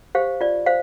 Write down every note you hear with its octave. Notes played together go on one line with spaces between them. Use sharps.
G4 C5 F5
F4 D5
C5 F5